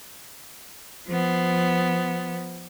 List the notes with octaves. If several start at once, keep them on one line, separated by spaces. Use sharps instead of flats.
F3 B3